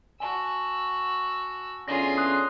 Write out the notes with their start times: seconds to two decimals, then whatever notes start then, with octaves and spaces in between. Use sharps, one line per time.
0.20 F#4 G#5 A5 E6
1.88 E2 D3 C#4 F4 G#4 A#6
2.17 C6 D#6 F#6